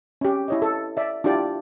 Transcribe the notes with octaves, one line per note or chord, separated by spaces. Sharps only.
C#4 G4
E4 C#5 D#5
A4
D5 E5
D4 E4 F4 G4 D5